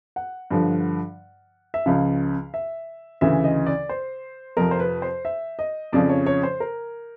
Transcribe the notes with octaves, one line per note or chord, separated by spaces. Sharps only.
F#5
G2 D3 F3
E5
C#2 C#3 F3 F5
E5
D2 C#3 E3 E5
D#5
D5
C5
F2 C3 F3 A#4
C5
B4
C5
E5
D#5
F2 C#3 F3 D5
C#5
C#5
C5
A#4